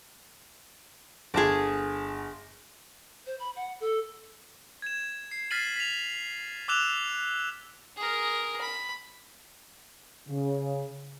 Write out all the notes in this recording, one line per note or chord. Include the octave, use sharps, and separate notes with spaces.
G1 G#4 D5 A5
C5
B5
F#5
A4
G#6 E7
C7
F6 A6 B6 C7 D#7 F#7
B6 F7
D6 E6 F#6 E7 F7
G#4 A#4
B5
C#3